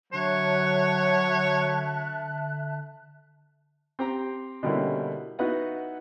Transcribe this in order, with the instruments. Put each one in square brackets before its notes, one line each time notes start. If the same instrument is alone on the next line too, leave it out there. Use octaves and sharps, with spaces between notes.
[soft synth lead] D3 [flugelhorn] F#3 [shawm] C#5 [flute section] E5 A5 F#6
[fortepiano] C4 G4 A#5
B2 D3 G3 A#3 C#4 E4
B3 D#4 E4 F#4 B4 F#5